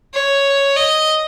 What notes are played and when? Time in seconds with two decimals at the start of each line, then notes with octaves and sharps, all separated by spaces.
0.14 C#5
0.77 D#5